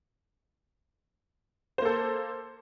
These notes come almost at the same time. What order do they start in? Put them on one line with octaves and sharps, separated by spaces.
C5 A#3 A4